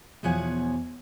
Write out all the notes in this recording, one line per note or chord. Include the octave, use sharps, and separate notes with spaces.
E2 B2 F3 C#5 F#5 G#5